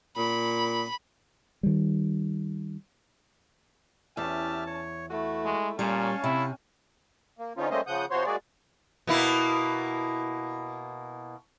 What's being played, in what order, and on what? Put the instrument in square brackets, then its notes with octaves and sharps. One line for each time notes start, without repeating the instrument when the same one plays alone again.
[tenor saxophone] A#2 [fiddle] B5
[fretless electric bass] D#3 G3
[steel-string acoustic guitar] E2 [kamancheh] C#4 A5 [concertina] G4 E5 F6
[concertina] C#5
[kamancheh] A3 E4 [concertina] F#4
[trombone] G#3
[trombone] A#2 [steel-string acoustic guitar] G3 [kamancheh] C#4 [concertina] C#5 F5 A5
[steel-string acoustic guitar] C3 [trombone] E4
[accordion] A#3
D3 F3 C#4 D#4 F4
G3 A3 A#3 C#4 C5 D#5
C#3 F3 F#5 D#6 G6
C3 F3 F#4 C5 C#5 C6
G#3 A#3 F#4 G#4 D5
[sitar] B2 A#3 E4